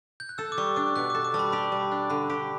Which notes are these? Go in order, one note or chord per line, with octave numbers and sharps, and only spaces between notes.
G6
F#6
A4 E6
D6
G3 C#6
D4 D6
B2 F#6
A4 D6
D6
G3 A5
B5
G4 B5
G3
D4
D3 B5
G4